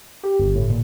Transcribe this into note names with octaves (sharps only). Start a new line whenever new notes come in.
G4
G1
A2
A#2